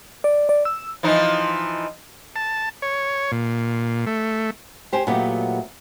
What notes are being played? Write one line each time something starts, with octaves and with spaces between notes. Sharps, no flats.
D5
D5
E6
E3 F3 D#4
A5
C#5
A#2
A3
G4 C5 G5 G#5
A#2 F#3 A3 B3 G4